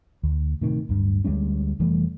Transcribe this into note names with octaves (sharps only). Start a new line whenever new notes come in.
D2
A2 C3 D#3
D1 G2
D2 G3 G#3 C#4
F1 E3 G3 A3